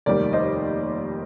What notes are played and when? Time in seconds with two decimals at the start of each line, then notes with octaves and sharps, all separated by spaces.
0.06 F1 D#2 D#3 G3 A#4 D5
0.33 C5 D#5